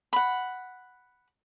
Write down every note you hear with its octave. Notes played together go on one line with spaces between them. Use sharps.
F#5 B5